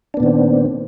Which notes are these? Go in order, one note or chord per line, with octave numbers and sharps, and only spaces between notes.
A#2 D#3 B3 C4 D4